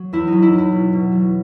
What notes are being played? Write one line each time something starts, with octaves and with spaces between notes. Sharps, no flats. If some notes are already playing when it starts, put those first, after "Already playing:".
Already playing: F#3
E2 E4
F#3 D#4
E4
E2
E4
B2
B2
F#3